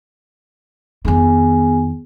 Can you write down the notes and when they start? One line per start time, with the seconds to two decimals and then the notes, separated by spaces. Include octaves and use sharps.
1.05 F2 D#3 B3 G#4 G#5